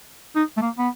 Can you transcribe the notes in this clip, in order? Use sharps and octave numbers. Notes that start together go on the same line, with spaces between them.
D#4
A3
A#3
B3